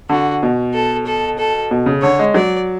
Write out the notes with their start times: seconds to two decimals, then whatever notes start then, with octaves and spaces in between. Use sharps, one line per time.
0.09 D3 F#4
0.43 B2
0.74 A4
1.06 A4
1.38 A4
1.71 B2
1.86 C#3
2.02 D3 C#5
2.19 G#3
2.34 F#3 D5